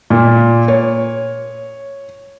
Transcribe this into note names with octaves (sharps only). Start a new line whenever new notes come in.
A#2
C#5